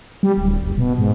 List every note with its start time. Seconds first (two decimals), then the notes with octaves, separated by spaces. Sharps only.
0.23 G3
0.37 D1
0.63 F#1
0.78 B2
0.98 G#2